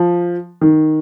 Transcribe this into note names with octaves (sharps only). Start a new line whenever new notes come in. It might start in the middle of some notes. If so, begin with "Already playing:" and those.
Already playing: F3
D#3